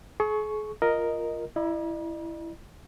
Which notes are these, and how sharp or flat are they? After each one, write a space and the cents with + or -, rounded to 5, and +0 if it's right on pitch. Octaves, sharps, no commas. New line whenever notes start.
G#4 +40 C#6 +0
F4 +0 A#4 +0 D#5 +0
E4 +10 D#5 -45 A#5 +45